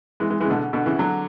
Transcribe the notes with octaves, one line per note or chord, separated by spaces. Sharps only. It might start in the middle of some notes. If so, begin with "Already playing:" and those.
E3 G#3
E3 G#3
C#3 E3 G#3
B2 D3
B2 D3
C#3 E3
D3 F#3